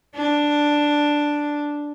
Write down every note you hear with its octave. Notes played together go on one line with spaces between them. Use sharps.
D4